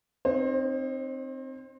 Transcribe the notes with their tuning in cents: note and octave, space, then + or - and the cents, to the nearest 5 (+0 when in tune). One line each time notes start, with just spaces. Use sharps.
C4 +0 D#4 -30 C5 +35